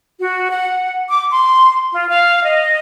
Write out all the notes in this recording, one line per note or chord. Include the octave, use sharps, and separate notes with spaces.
F#4
F#5
D6
C6
F4
F5
D#5